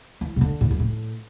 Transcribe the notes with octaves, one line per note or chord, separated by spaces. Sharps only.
E3
B2
D3
A2
F#2
A2